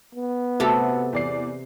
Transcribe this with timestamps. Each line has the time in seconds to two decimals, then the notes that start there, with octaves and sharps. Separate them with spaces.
0.15 B3
0.60 C3 A3 F#4 A4 F#5
1.13 E2 D5 C7